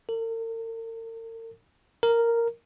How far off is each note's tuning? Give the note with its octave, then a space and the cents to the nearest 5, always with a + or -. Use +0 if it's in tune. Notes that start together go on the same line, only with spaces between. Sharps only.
A#4 -45
A#4 -5